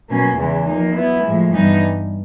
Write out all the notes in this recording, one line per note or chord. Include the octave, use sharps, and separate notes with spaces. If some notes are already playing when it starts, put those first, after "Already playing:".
B2 F#3 A#3 C#4
E2 C#3 E3 G#3
F3 A#3 D#4
F#3 B3 E4
A2 F3 G#3
G2 E3 G3 B3 D#4